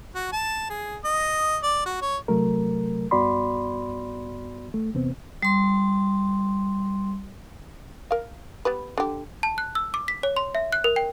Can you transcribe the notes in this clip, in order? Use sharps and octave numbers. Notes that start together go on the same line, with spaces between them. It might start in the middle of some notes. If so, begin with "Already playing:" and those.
F#4
A5
G#4
D#5
D5
F#4
C#5
C3 F#3 A3 A#4
G2 B3 F#4 D5 B5 C6
A3
E2 C3 B3 C4
G3 C6
A#4 F5
B3 G4 B4
D3 G4
A5
F#6
E6
D6
B6
C#5
C6
E5
F#6
A#4
G5